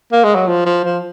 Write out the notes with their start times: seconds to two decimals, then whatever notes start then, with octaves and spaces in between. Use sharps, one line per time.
0.12 A#3
0.24 G#3
0.35 F#3
0.47 F3
0.65 F3
0.84 F3